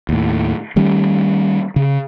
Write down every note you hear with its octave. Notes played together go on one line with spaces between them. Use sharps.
D#2 A2
D#3 G3 A3 C#4
C#3